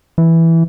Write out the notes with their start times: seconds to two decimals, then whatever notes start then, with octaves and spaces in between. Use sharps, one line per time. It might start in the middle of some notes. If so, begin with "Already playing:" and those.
0.18 E3